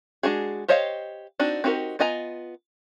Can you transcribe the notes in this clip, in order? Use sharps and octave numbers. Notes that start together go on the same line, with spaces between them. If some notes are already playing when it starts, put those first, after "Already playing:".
G#3 D4 F#4 G#4
G4 C5 C#5 D#5 F5
C4 D4 D#4 F#4
C4 D#4 F#4 G4 A#4
B3 F4 D#5 G#5 A#5